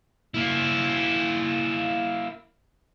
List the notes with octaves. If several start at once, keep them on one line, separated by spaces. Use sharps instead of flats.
A#3 E4